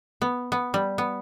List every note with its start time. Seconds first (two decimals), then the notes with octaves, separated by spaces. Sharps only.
0.22 B3
0.52 B3
0.74 G3
0.98 B3